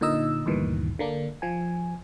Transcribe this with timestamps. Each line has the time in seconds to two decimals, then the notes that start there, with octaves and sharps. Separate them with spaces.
0.01 A#2 D3 D#4 D#5 E6
0.46 D2 G2 A#2 D#3 E3
0.99 D3 A#3 D4
1.42 F3 G#5